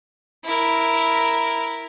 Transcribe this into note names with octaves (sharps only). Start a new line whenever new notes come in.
E4 A#4